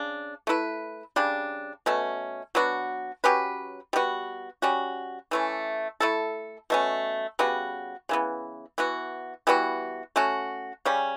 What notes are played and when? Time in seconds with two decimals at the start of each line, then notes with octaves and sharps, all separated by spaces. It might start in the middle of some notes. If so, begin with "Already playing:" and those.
Already playing: C#3 D4
0.47 A3 E4 B4
1.16 C#3 G3 D4
1.86 B2 A3 C#4
2.55 F#3 B3 D4 F#4
3.24 F#3 C#4 G4 B4
3.93 G3 B3 F#4
4.62 G3 C#4 F#4
5.31 E3 A3 C#4
6.00 A3 E4 A4
6.70 B2 A3 C#4
7.39 C#3 G3 B3 F#4
8.09 C#3 E3 B3
8.78 E3 B3 F#4
9.47 E3 G3 B3 F#4
10.16 A3 C#4 F#4
10.85 C#3 G3 C#4